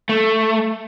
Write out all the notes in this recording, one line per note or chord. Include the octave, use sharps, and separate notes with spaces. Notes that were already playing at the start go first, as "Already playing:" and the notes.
A3